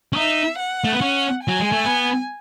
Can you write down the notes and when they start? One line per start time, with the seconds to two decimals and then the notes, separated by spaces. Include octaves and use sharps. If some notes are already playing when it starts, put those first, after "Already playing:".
0.13 C#4
0.16 D#4 E5
0.59 F#5
0.84 A3
0.92 B3
1.01 C#4
1.43 F#3 G#5
1.60 G#3
1.72 A3
1.85 B3